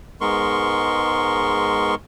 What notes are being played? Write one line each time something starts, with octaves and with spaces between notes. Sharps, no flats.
G#2 G#3 B3 A#4 C6 C#6